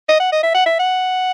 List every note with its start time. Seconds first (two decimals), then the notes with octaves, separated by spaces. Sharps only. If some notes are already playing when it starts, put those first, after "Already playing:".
0.09 D#5
0.20 F#5
0.32 D#5
0.43 E5
0.55 F#5
0.66 E5
0.79 F#5